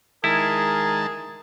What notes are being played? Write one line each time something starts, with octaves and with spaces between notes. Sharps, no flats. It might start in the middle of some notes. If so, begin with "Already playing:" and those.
D#3 G#3 E4 G#4 A#4 A5